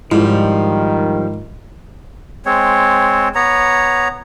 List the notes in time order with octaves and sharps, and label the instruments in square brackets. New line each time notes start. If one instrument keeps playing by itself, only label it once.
[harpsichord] G#2 [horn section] D#3 [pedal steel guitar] F3 G3 [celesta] E4 F4
[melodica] G#3 C4 C#5
B3 C#5 A#5